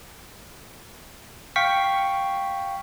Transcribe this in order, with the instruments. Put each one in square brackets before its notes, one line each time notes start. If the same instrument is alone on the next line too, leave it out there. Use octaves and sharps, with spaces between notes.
[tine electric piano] F5 G5 C#6 B6